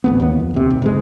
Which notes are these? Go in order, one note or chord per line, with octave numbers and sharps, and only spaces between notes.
A1 D2 B3
D#2 A#3 B3
F2
D2 C3
B1
F#1 G#2 G#3